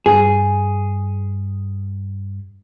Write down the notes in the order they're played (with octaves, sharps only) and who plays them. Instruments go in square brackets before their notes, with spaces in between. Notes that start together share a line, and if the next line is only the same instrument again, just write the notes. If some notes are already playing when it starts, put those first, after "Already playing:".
[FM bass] G2 [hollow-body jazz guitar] G#4